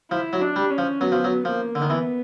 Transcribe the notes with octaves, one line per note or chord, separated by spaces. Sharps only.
F3 E4
F#3
D4
G3
C#4
F3
F#3 B3
F3
F#3
F3 A#3
D3
D#3
E3 B3